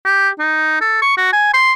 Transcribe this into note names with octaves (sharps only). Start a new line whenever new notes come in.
G4
D#4
A4
C#6
F#4
G#5
C6